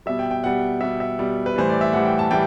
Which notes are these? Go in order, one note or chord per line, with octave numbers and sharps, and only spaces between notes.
B2 G3 E5
G5
G5
B2 G3 F#5
B2 G3 E5
E5
B2 G3
B4
A2 E3 G3 C5
D5
E5
A2 E3 G3 F#5
G5
A5
A2 E3 G3 G5